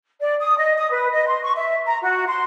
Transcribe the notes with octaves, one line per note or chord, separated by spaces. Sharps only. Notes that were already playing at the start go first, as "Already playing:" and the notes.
D5
D#6
D#5
D#6
B4
D#5
C6
C#6
E5
A#5
F#4
C6